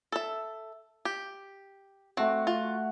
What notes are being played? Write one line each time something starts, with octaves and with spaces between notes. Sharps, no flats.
A4 E5
G4
A3 C4 F#4
F4